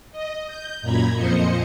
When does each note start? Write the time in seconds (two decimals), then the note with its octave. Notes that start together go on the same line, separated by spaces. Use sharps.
0.12 D#5
0.47 G6
0.82 F#2 A#2 A#5 B5 G#6
1.15 F2 A#2 F3 C5 D#5 C#7